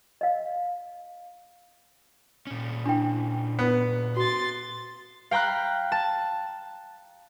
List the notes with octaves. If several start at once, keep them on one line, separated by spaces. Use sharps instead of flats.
D#5 F5
A#2 C#4
D4 E4 G5
B3
F#4 C6 A6
F5 G5 A#5 B5 F#6
A5